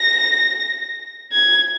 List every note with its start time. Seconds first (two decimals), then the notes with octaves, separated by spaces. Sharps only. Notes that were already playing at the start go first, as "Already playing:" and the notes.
Already playing: A#6
1.32 G#6